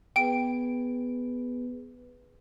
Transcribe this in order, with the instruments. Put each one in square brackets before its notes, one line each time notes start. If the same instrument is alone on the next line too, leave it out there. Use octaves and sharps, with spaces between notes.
[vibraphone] B3 G#4 B4 [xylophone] G5 D7